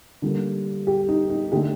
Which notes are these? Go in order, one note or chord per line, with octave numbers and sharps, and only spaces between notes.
D3 G3 A#3
G4
D#4
D#4
D3 A3 G4